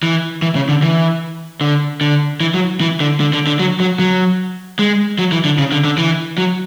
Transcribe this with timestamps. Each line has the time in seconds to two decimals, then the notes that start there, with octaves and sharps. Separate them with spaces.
0.03 E3
0.42 E3
0.56 C#3
0.69 D3
0.82 E3
1.61 D3
2.01 D3
2.40 E3
2.54 F#3
2.80 E3
3.00 D3
3.20 D3
3.33 D3
3.47 D3
3.59 F#3
3.80 F#3
3.99 F#3
4.79 G#3
5.19 F#3
5.32 E3
5.45 D3
5.58 C#3
5.72 D3
5.84 D3
5.98 E3
6.38 F#3